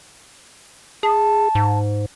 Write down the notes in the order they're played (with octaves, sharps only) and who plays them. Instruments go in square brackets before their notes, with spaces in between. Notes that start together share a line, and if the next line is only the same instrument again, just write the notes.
[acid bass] G#4 [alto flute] A5
[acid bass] G#2